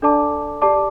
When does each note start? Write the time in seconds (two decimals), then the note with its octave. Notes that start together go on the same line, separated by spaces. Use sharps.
0.02 D4 A4 D5 A5 D6
0.62 G4 D5 A5 D6